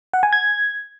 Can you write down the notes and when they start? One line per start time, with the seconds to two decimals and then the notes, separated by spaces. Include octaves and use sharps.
0.14 F#5
0.23 G#5
0.33 G#6